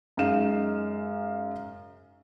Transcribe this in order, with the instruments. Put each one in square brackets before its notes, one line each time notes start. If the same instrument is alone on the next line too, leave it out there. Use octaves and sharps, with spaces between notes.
[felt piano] F#2 G#3 D#4 F5 E7